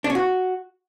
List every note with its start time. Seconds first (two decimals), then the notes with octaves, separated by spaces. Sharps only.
0.04 D4
0.10 C#4
0.15 F#4